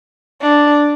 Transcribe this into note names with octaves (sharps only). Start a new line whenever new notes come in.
D4